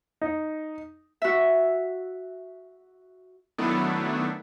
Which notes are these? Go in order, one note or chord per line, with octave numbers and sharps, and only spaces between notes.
D#4
F#4 E5
D#3 F#3 A3 B3 D4 E4